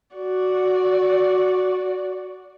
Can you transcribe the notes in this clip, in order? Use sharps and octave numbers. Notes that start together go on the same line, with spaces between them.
F#4 D5